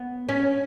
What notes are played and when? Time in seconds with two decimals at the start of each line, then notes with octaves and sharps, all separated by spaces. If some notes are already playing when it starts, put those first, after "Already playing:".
Already playing: B3
0.29 C#4